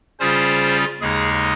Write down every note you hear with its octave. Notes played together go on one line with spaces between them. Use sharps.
C#3 G3 C#4 F4 G#4 C5
D#2 C#3 G#3 D#4 G#4